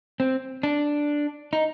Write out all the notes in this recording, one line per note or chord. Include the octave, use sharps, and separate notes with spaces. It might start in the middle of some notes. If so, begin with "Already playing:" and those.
C4
D4
D#4